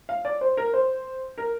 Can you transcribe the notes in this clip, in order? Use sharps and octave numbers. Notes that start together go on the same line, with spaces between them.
F5
D5
C5
A#4
C5
A#4